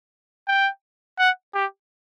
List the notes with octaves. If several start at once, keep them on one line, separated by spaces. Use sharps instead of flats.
G5
F#5
G4